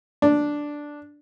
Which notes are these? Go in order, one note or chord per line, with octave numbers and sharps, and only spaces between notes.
D4